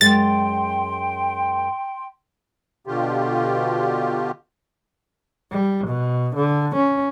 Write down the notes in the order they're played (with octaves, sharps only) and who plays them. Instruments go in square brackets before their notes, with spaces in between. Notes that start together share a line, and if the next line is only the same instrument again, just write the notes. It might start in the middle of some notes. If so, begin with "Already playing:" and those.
[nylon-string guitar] F#2 G#3 [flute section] G5 C6 [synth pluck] A6
[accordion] B2 D3 F4 G4
[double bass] G3
B2
D3
C#4